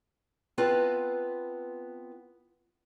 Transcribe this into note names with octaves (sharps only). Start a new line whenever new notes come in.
B3 C4 F4 B4 A5